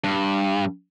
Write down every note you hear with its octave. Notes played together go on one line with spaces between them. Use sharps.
G2